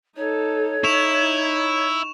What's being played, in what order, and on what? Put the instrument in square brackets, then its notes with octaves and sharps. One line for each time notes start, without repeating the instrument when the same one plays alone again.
[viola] D#4 A4 [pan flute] C#5
[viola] D#4 [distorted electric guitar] E4 [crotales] C#6 E7 F7